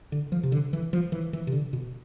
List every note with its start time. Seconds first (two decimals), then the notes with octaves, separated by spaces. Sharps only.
0.12 D3
0.32 F3
0.43 C3
0.52 D3
0.73 E3
0.93 F3
1.12 E3
1.33 E3
1.47 C3
1.52 D3
1.73 B2